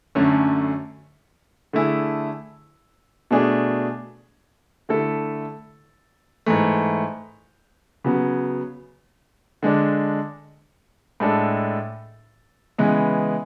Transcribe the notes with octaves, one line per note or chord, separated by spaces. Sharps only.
F#2 D3 A3 C#4
D3 A3 E4 G#4
B2 A3 D4 G#4
D3 A3 E4 A4
G#2 E3 A3
C#3 F#3 B3
D3 G#3 D4
A2 G#3 D4 A4
C#3 E3 G#3 B3